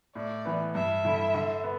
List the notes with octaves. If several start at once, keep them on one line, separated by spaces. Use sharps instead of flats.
A2 D5
E3 B3
G2 E5
D3 G3 E4
D3
B3